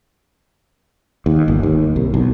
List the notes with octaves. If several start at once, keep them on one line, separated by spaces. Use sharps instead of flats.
D#2
G1
D#2
C2
B1